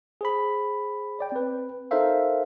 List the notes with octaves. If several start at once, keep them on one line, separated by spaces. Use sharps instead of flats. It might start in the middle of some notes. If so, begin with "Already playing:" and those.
G#4 C5 B5
C#5 D5 G5
C4 B4
D#4 A4 A#4 C5 E5 F5